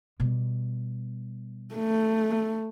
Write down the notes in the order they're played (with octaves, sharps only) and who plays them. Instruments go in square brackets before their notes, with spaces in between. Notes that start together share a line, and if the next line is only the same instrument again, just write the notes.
[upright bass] B2 G3
[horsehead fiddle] A3